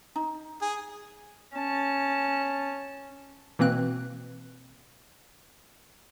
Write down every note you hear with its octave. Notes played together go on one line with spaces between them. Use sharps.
D#4
G#4
C#4 A5
B2 E3 A#3 C4 F#6